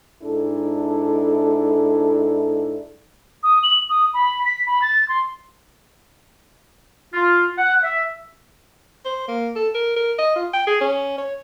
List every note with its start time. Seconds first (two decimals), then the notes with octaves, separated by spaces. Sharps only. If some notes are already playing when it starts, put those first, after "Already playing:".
0.23 G#2 D4 E4 A4
3.43 D#6
3.63 F#7
3.89 D#6
4.13 B5
4.45 B6
4.67 B5
4.82 A6
5.08 C6
7.14 F4
7.58 F#5
7.83 E5
9.05 C5
9.28 A#3
9.56 A4
9.74 A#4
9.96 A#4
10.19 D#5
10.36 F4
10.54 G5
10.67 G#4
10.81 C#4
11.18 C#5